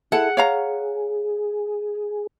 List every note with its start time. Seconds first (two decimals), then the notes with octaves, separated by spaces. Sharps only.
0.12 E4 G#4 A4 F#5
0.37 C#5 F5 A#5